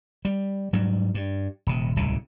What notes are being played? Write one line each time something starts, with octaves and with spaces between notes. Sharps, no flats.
G3
G#2 F#3 G3
G2
D#1 C3
D1 C2 A#2 C#3